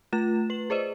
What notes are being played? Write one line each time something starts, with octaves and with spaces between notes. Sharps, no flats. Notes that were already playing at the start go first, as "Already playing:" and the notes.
A3 F4 A6 E7
B4 F#7
G#4 C5 D5 D#5